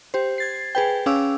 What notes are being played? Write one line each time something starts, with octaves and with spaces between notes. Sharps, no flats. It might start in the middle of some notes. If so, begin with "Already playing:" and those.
G4 C5
G#6 A6 C7
G#4 B4 G5
C#4 G#4 F5 D6 E6